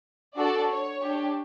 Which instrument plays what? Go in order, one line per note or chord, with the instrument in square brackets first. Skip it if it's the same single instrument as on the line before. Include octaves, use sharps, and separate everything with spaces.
[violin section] D4 F#4 A4 D5
C#5
D4 G4